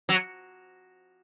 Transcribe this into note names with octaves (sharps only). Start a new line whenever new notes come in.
F#3